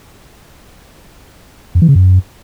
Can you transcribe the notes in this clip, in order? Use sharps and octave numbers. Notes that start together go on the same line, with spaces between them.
F2
E3
C#3
F#2